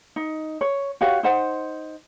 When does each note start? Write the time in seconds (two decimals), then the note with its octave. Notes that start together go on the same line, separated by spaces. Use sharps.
0.16 D#4
0.61 C#5
1.01 F#4 G4 C#5 F5
1.23 D#4 C5 F#5